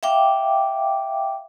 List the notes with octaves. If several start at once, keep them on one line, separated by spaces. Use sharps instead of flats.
E5 F5 G5 D6